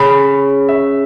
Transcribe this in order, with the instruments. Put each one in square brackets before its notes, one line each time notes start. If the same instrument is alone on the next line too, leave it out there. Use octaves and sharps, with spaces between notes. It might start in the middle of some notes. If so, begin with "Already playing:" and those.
Already playing: [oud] C#3 [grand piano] B5
[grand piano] E5